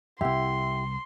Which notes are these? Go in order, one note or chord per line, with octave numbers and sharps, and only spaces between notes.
C2 F2 E4 G4 E5 F#5 C6